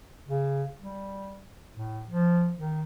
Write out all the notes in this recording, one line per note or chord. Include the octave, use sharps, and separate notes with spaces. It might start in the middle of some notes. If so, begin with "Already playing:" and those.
C#3
G3
A2
F3
D#3